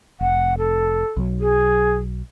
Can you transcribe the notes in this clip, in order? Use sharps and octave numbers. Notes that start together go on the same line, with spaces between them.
F1 F#5
A4
B1 F#3
G#4